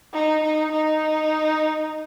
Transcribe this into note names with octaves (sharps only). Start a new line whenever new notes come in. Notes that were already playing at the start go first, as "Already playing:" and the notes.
D#4
D#4
D#4